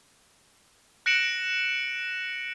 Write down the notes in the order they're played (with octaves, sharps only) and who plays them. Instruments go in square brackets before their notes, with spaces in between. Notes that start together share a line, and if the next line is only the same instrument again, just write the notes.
[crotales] F#6 A#6 C#7 D7 E7 F#7